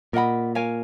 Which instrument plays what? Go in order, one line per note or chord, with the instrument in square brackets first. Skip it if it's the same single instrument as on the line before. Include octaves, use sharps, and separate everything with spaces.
[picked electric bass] A#2 [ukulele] A#4 D#5 F#5 B5
[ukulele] A#4 C#5 F5 G#5